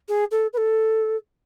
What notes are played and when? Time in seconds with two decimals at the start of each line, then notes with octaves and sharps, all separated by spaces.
0.09 G#4
0.31 A4
0.53 B4
0.57 A4